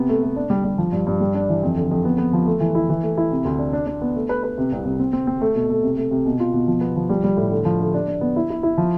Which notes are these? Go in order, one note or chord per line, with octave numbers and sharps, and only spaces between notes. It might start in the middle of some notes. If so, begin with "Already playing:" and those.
Already playing: C3 B3
A3
A3
D4
G3
G3
F3
G2
G2
G3
D4
E3
F2
D3
F2
B3
B3
F3
A3
E3
E4
E3
A3
E4
C3
D2
D4
D4
D4
B3
A3
B4
B4
C3
C2
C2
C4
C4
C4
A3
B2
A3
C3
A3
C3
B2
F4
B2
F3
B3
F3
G3
G3
A2
D3
F3
D3
D4
D4
B3
E4
E4
E4
F3